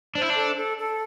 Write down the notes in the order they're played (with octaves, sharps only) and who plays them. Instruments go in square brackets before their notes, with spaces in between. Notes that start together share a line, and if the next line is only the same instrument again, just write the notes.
[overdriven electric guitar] D4 [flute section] C5
[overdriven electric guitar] E4
D4
[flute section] A4
A4
A4